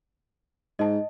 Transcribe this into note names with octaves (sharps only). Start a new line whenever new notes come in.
G#2 D#5 A5